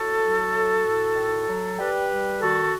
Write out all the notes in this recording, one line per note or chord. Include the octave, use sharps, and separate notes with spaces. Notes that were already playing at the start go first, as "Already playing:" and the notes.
Already playing: A2 F#4 A4
F#3
A2
A2
D#3
F#3
G3 G4 B4
G3
D#3 F#4 A4